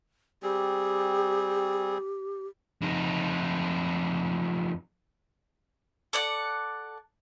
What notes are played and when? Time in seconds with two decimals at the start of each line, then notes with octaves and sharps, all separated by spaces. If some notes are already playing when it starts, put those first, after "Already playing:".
0.43 G3 C4 G4 G#4
2.82 F2 D#4
6.13 A4 D5 F#5